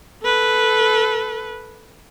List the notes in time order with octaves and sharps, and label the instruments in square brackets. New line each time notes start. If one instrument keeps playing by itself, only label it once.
[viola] A4 B4